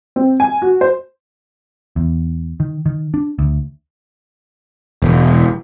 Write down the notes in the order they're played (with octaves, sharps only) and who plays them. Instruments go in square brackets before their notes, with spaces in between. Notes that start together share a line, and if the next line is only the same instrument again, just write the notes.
[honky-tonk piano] C4
G#5
F#4
C5
[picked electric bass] E2
D#3
D#3
D4
D2
E1